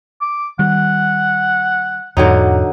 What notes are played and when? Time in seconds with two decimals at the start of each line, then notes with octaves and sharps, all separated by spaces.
0.21 D6
0.59 D#3 G3 F#5
2.17 E2 G#2 D3 F#3 D#4